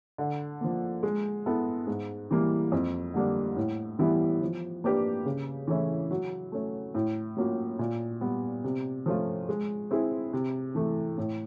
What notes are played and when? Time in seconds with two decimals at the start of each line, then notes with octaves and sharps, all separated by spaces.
0.18 D3
0.61 F3 A#3
1.03 G#3
1.46 B3 E4 A4
1.87 G#2
2.31 E3 G3 A#3
2.72 F2
3.14 D3 G3 A#3 D4
3.56 A2
3.99 E3 G3 B3 E4
4.42 F3
4.84 A#3 D4 G4 B4
5.26 C#3
5.68 E3 A3 C#4 E4
6.11 F#3
6.52 A3 C#4
6.95 A2
7.37 F#3 A#3 C#4 F4
7.79 A#2
8.21 G3 B3
8.64 C3
9.06 F3 A3 C#4 F4
9.49 G#3
9.91 C4 E4 G#4
10.33 C3
10.75 E3 A3
11.18 A2